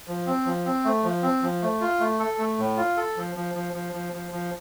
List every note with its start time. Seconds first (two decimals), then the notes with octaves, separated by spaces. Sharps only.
0.08 F3
0.26 C4
0.45 F3
0.65 C4
0.84 A3
1.04 F3
1.23 C4
1.42 F3
1.62 A3
1.81 F4
2.00 A3
2.19 A4
2.38 A3
2.58 A2
2.77 F4
2.97 A4
3.17 F3
3.36 F3
3.55 F3
3.73 F3
3.93 F3
4.13 F3
4.32 F3